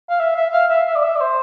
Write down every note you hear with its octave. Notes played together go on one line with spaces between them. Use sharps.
F5
E5
E5
F5
E5
E5
D5
E5
D5
C5